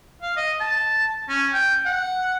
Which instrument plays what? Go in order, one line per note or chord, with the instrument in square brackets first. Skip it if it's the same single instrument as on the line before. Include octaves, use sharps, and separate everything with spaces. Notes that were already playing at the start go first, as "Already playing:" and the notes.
[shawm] F5
D#5
A5
C#4
G5
F#5